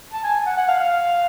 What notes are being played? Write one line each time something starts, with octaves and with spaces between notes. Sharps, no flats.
A5
G#5
G#5
F#5
F#5
F5
F5